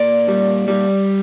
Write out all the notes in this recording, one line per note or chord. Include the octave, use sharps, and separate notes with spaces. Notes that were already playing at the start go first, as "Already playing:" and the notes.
Already playing: A#2 D5
G3
G3